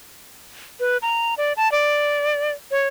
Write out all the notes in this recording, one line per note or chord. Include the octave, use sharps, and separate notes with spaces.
B4
A#5
D5
A5
D5
C#5